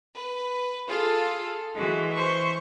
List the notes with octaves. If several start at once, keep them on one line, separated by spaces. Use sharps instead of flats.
B4
F4 G#4 A4 F5
E3 G#3 F#4
C5 C#6